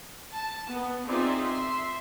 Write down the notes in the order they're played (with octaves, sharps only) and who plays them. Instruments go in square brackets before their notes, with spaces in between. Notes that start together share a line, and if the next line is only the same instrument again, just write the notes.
[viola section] A5
B3
C4 D#4 F4 G#4 D5 E5
E5 C6